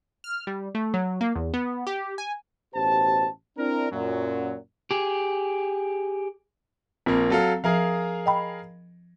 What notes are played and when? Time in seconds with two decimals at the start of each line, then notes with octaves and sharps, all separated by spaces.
0.24 F6
0.47 G3
0.75 A3
0.94 F#3
1.21 A#3
1.35 E2
1.54 B3
1.87 G4
2.18 G#5
2.75 A1 B2 G4 C5 A5
3.58 C4 D4 E4 A#4
3.91 F#2 A#2 F#3
4.91 G4 G#4
7.06 A#1 A#3 C4
7.30 F#3 A4 F5
7.64 F3 G#4 A#4 F5
8.26 D#5 G5 B5